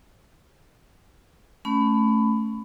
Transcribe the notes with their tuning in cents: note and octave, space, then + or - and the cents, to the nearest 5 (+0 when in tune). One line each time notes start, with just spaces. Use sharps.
A3 +0 C#4 +0 B5 +20